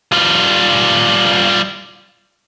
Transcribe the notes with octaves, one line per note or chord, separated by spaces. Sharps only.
G3 F4